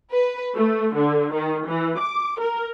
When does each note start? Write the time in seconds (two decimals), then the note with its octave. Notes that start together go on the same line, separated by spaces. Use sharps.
0.12 B4
0.55 A3
0.95 D3
1.34 D#3
1.68 E3
2.00 D6
2.40 A#4